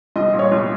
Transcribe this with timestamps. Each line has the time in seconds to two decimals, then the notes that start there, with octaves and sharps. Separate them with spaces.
0.16 C2 D#5
0.33 A#2
0.39 C#5
0.52 C2